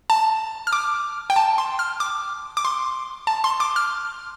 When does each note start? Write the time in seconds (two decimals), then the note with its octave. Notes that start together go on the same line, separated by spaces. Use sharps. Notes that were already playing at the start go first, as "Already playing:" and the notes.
0.10 A5
0.67 F6
0.73 D6
1.30 G5
1.36 A5
1.58 C6
1.79 F6
2.00 D6
2.57 D6
2.65 C6
3.27 A5
3.44 C6
3.60 D6
3.76 F6